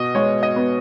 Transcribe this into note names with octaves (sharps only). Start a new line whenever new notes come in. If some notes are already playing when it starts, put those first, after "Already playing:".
Already playing: B2 D#5
G#3 C#5
D#5
B3